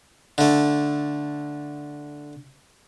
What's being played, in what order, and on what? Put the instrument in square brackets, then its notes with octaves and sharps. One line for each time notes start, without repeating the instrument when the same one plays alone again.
[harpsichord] D3 A3